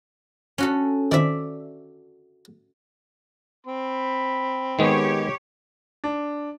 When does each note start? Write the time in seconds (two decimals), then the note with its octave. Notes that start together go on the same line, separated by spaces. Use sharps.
0.58 C#4 F#4 A4
1.12 D#3 C4 E4 D5 E5
3.67 C4 B5
4.79 D#3 G#3 B3 G4 C#5
6.04 D4